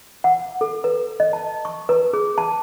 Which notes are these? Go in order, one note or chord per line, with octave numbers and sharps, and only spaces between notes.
F#5
A4
B4
D#5
A5
C#6
B4
G#4
A5